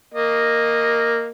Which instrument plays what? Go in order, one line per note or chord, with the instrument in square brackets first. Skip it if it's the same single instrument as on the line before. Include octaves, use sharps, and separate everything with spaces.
[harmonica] A#3 D#5